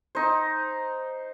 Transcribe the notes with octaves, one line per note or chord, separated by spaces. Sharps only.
D#4 C5